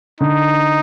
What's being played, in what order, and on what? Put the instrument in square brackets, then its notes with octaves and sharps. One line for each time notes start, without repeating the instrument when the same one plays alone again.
[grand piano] D3 [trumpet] D#4